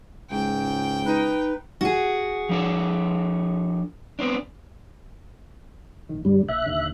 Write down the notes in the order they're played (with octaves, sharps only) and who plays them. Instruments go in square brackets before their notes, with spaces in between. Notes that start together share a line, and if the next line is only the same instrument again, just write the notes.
[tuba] C#2 [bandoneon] G#2 [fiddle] G5
[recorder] D#4 [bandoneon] B4
[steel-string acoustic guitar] F#4 G#4
[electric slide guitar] F3 D4 A4
B3 C4 D4
[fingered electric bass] A#1 D#3
[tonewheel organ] G2 G3 [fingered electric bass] D3
[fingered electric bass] A#1 [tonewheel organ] E5 F#6
[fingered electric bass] D#2 A#2 D3